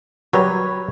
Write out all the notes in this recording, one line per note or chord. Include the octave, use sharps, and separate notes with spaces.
F#3 G3 B4 C#5 A#5 B5